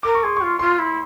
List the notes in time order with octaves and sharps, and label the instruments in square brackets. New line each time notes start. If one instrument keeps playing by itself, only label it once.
[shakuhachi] A#4 [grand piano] D6
[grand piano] C#6
[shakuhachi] G#4 [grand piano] C6
[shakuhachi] F4 [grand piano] C#6
[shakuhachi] F4 [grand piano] C6
[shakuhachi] E4